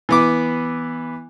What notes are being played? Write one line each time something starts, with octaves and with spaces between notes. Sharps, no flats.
E3 B3 D6